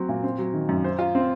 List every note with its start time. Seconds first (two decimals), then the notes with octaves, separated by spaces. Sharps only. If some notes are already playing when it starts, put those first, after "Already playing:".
Already playing: F#3 C4 F#4
0.09 A#2
0.23 C4
0.38 F#3
0.54 D#3
0.69 F#2
0.84 C5
0.99 F4
1.15 C4